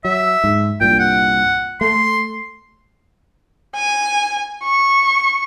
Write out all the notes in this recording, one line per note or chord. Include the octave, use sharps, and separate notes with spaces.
F#3 E5
G#2
C2 G2 A#2 G5
F#5
A3 C6
G#5
C#6